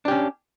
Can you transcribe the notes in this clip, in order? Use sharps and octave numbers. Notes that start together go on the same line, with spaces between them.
C#4 D4 G4